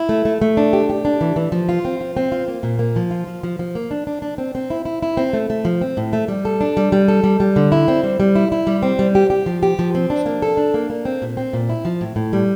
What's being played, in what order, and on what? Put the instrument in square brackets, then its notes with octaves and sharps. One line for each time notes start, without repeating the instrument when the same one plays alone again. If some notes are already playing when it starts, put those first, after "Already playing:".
Already playing: [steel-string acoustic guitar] E4
A3
A3
A3
D4
G4
G4
D4
E3
E3
F3
F4
C4
F4
C4
F4
A#3
A#2
A#3
F3
F4
F3
F3
F3
A#3
D4
D4
D4
C4
C4
E4
E4
E4
C4
A3
A3
F3
C4
A2
A3
G3
A4
D4
G3
G3
A4
G3
G3
D3
E4
C4
G3
G3
E4
E4
G3
C4
G3
G4
G4
F3
G4
F3
C4
D4
A#3
A4
D4
A#3
A#3
C4
A#2
C4
A#2
E4
F3
A2
A2
G3